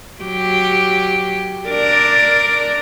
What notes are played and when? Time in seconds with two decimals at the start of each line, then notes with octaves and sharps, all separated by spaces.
0.21 F#3 G4
1.68 D4 A#4 D5